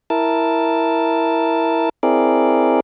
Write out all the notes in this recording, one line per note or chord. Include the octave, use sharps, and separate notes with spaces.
E4 A#4 A5
C4 E4 G#4 A#4 D5